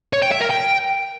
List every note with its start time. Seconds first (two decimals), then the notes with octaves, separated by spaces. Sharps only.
0.13 C#5
0.22 G5
0.31 E5
0.41 A#4
0.50 G5